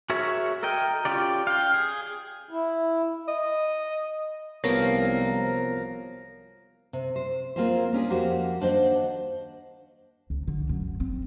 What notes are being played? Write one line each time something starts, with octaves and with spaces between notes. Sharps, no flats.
F#4 G#4 A#4 C#5 E5
A4 A#4 D#5 G5
C#4 F4 G4 D5
F5 G5
G#4
E4
D#5
C2 F3 F#3 A#3 B3 A#4 C#5 A#6
C3
C5
A#3 C4 F4 G#4 A#4 C5
A#3 C#4 D4 G#4
F2 A#3 F#4 G4 C5
D#2 D4 C5 D#5 F#5
C#2
D3
F#2
C4